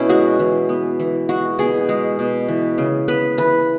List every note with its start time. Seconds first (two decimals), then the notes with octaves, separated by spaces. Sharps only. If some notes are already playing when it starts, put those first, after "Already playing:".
Already playing: B2 C#4 E4
0.09 G#3 F#4
0.39 E3
0.69 B3
1.00 E3
1.29 G#3 F#4
1.59 B2 G#4
1.89 G#3
2.19 B2
2.48 E3
2.78 C#3
3.08 B3 B4
3.38 E3 B4